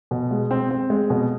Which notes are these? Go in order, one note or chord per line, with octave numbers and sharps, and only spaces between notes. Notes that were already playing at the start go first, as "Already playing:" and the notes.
B2
G#3
C4
C4
G#3
B2